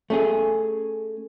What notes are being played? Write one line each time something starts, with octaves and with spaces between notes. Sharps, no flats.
A3 C#4 G#4